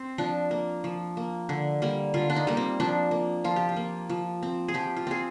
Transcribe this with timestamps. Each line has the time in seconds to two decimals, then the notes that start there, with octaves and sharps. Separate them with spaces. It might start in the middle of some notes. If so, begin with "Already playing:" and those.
Already playing: C4
0.18 F3 D4
0.51 A#3
0.84 F3
1.17 A#3
1.49 D3
1.82 G3 A#3
2.14 D3 F4
2.30 D4
2.36 D#4
2.47 G3 A#3
2.57 C4
2.80 F3 D4
3.11 A#3
3.44 F3 F4
3.56 G4
3.69 F4
3.76 A#3
4.10 F3
4.43 C4
4.68 G#4
4.74 F3 G4
4.96 F4
5.07 C4 G#4